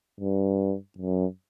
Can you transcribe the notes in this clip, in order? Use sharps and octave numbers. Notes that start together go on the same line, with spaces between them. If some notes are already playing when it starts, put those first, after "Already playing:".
G2
F#2